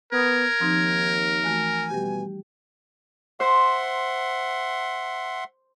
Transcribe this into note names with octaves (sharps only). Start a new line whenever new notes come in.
B3 A#4 G#6
D#2 F3 C4 D#4
E3 A3 F#4 G#5
B2 G3 G4
C5 E5 F#5 C6